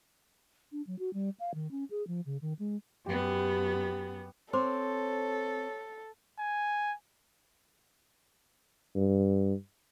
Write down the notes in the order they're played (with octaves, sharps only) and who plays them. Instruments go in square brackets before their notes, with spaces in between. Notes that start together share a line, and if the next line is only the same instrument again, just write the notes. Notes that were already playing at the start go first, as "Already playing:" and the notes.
[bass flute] D4
F#3
F#4
G3
F5
D#3
C#4
G#4
F3
C#3
D#3
G#3
[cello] F#2 B3 [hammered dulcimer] G4
[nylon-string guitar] C4 [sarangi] A4 [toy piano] C5 C6 D6 [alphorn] C#5
[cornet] G#5
[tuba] G2